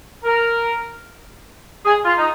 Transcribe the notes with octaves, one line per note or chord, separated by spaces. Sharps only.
A#4
G#4
F4
D#4